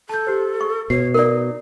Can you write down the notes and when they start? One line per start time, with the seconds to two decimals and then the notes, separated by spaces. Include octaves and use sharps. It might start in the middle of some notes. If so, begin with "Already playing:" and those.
0.09 A4 A5 G6
0.27 G4 C5
0.61 C#6
0.90 B2 C#5 C7
1.14 D#4 A#4 D5